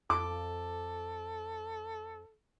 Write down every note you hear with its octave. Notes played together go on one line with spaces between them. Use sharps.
F2 A4 D6